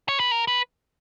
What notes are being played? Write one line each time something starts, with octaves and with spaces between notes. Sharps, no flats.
C#5
B4
A#4
B4